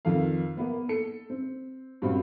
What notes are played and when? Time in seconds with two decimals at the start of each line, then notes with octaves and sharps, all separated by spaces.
0.05 F2 D#3 A4 F5
0.57 A#3 B3
0.89 A4 C#7
1.30 C4
2.02 G2 A#2 C#3 G3 C4 F#4